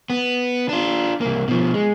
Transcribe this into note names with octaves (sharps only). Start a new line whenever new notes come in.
B3
D4 F4
C2 A#3
B2 F3
G#3